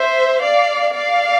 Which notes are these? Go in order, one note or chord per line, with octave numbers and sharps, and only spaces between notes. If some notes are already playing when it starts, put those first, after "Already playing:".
Already playing: C5 E5
D5 F5
D5 F5